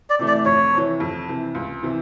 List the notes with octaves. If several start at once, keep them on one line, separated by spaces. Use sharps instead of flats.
D5
C3 E3 A3
D5
F2 C#5
C3 E3
F2
C3 E3
C#2
C3 E3